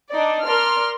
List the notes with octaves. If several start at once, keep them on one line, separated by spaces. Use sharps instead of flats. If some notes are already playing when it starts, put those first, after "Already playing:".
D4 D#4 D5
A#4 D5 C6 F6